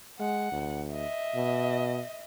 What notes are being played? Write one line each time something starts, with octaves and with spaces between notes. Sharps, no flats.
G#3 F#5
D2
D#5 E5
B2